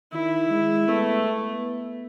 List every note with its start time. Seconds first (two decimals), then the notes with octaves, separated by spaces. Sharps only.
0.12 D#3 E4
0.50 G#3
0.88 A3 B3